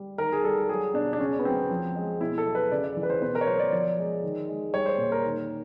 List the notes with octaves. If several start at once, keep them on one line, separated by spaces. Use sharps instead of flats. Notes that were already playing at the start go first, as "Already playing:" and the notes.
Already playing: G3
D#3 A#4
G#4
G3 A4
F#3 G#4
B2 D4
D4
C#3 C#4
B3
F#3 C4
F3
G#3
B2 E4
A4
F#3
B4
C#3 D5
D5
E3
B4
C5
B2 B4
A#4
C#5
F#3 C5
D5
F3 D5
G#3
D#3
G#3
G3 C#5
C5
A#2
A#4
D#3